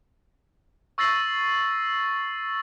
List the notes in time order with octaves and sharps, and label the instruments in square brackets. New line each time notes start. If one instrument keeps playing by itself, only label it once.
[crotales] C#6 E6 A6 A#6 C7 F#7